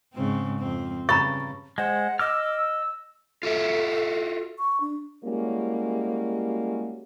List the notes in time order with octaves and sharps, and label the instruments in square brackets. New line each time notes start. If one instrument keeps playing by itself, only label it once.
[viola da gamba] G#2 C#3 C4
F2 C4
[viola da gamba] G2 C#3 [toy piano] A#5 B5 C#6 [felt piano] A6
[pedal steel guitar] G#3 C5 [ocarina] F#5
[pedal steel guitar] D#5 D6 F6 [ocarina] E6
[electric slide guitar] F4 F#4 E5 [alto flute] A4
[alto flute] C#6
D4
[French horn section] G3 G#3 A#3 C#4 E4 F#4